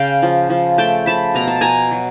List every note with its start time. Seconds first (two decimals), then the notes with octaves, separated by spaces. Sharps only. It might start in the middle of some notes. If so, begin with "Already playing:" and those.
Already playing: C#3 F5 G5
0.22 F3
0.50 F3
0.78 A3 G5 A5
1.06 F3 A5 B5
1.34 B2 A#5
1.47 A5
1.61 B2 G#5 A#5
1.91 F#3